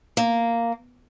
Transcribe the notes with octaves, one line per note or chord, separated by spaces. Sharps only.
A#3